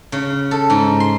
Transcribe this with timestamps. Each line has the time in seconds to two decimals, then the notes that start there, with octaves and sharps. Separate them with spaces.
0.12 C#3
0.51 A4
0.70 G#2
1.00 C6